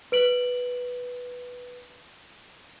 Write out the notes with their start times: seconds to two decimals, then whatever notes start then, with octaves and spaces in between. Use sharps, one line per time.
0.12 B4 D7 F#7